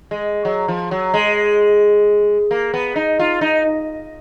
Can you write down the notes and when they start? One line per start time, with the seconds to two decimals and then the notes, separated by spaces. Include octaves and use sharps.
0.11 G#3
0.45 F#3
0.68 F3
0.91 F#3
1.14 G#3
2.51 A#3
2.74 B3
2.96 D#4
3.20 F4
3.41 D#4